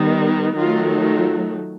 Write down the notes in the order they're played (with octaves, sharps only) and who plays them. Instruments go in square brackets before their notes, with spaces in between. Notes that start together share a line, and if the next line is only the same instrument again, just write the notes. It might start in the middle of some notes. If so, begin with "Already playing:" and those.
Already playing: [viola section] D#3 G3 B3
D#3 F#3 A3 F4
F4